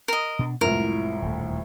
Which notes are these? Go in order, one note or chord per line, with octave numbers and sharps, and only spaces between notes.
A#4 D#5
B2 D4
C2 F2 A2 G#3 A#4
D#1 D2 A3